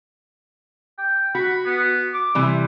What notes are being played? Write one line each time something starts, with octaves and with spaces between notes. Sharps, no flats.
G5
F#4 B5
B3
D6
C3 E3 G3